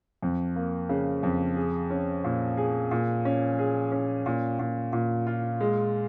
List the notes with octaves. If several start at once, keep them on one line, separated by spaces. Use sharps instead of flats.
F2
A#3
C#3
F2
G#4
C#4
A#2
G#4
A#2
C#4
G#4
C#4
A#2
A#2
A#2
F4
G#3